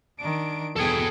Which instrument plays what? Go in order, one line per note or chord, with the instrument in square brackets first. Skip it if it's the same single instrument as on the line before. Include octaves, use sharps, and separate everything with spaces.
[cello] D#3 D4 [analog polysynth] D7
[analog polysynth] E2 B2 G#6 [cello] B3 G#4 [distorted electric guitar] A4 G5